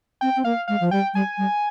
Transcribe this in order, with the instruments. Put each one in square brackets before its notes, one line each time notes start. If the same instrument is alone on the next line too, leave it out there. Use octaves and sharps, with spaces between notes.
[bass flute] C4 [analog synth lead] G5
[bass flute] C4
[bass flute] A#3 [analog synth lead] F5
[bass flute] G#3 [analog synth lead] F5
[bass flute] F3
[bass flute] G3 [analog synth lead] G5
[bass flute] G3 [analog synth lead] G#5
[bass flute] G3